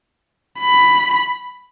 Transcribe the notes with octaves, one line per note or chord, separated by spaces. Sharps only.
B5